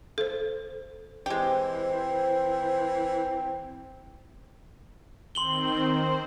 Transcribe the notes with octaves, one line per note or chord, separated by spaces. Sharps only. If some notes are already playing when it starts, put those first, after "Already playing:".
A4 C5
E3 G#3 C4 G4 C5
D#3 C4 C6 F#7 G7
C5